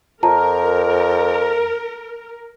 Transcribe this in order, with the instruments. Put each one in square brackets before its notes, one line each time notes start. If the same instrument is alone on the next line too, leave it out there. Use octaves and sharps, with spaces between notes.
[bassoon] F2 [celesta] F4 A5 A#5 [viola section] A#4